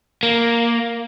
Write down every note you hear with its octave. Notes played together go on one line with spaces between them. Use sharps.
A#3